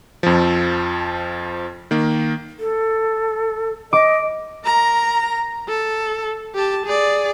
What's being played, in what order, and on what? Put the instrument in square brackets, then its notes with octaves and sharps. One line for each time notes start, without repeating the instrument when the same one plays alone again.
[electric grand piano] F2 F3
D#3 A#3
[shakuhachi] A4
[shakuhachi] D#5 [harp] D6
[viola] A#4 A#5
A4
G4 A5
G#4 D5